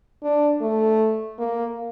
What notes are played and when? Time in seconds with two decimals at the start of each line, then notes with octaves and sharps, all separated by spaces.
0.23 D4
0.61 A3
1.38 A#3